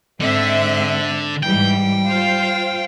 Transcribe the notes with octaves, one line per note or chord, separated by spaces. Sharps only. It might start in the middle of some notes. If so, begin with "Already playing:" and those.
G#2 D3 C4 E5
G#2 E3 G3 G5
F4 C5 F5